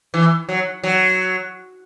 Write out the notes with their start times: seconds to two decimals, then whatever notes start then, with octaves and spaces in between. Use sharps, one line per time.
0.14 E3
0.49 F#3
0.83 F#3